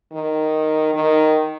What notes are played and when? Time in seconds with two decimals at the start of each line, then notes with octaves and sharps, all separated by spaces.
0.12 D#3
0.94 D#3